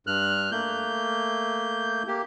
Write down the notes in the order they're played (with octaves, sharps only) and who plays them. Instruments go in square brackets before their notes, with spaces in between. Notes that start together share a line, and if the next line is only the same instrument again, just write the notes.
[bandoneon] G2 F6 F#6
A3 A#3 G6
A#3 G4